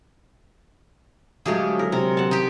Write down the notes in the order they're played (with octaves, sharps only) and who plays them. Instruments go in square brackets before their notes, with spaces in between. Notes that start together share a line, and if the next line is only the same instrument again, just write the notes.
[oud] D3 F#3 G#3 [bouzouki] F3 A3 G4 [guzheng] G#4
[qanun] A#4
[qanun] C3 A#5 [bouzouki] A#4
[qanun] F#5 A5
[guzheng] D#4 G4